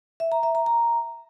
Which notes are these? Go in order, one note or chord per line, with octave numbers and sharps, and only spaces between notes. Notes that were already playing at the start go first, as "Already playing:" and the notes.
E5
A#5
E5
A#5
A#5